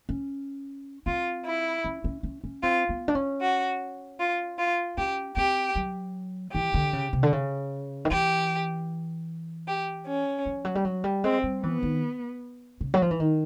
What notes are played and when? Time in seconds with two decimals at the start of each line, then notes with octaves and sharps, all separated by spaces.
0.09 C#4
1.06 C4 F4
1.46 E4
1.85 C#4
2.04 C#4
2.23 C#4
2.44 C#4
2.63 C4 F4
2.89 B3
3.08 D4
3.15 C#4
3.41 F#4
4.20 F4
4.59 F4
4.98 C#4 G4
5.37 C4 G4
5.76 F#3
6.54 E3 G4
6.74 D3
6.93 C#3
7.13 C3
7.23 D3
7.33 C#3
8.05 D#3
8.11 E3 G4
9.68 G4
10.07 C#4
10.46 F3
10.65 F#3
10.75 G3
10.85 F#3
11.04 G3
11.24 G#3 C4
11.43 G3
11.63 E3 B3
11.83 D#3
12.81 C#3
12.94 F#3
13.02 F3
13.11 E3
13.20 D#3